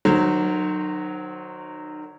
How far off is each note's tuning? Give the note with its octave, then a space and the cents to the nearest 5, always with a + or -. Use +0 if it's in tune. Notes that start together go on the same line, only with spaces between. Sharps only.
D#3 -35 F#3 -5 C5 +0